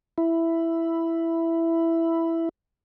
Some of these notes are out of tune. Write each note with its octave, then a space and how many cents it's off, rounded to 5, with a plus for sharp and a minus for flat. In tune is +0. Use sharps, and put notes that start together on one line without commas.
E4 +5